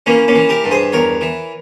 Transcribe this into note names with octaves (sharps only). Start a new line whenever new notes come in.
E3 A#3 C#4
A#3 C#4
E3
G4 A#4
G2
G#4 C5
E2 A#4 C#5
E3